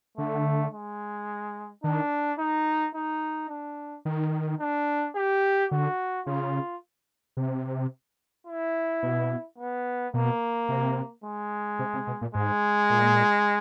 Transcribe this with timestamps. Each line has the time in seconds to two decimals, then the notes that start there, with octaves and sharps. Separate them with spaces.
0.18 D3 A3
0.73 G#3
1.84 D#3 D4
2.39 D#4
2.95 D#4
3.49 D4
4.05 D#3
4.60 D4
5.16 G4
5.71 D3 F#4
6.26 C#3 F4
7.37 C3
8.47 E4
9.03 B2
9.58 B3
10.14 B2 A#3
10.69 C3
11.24 G#3
11.79 C3
11.93 C3
12.07 B2
12.21 A#2
12.35 G#2 G#3
12.90 A#2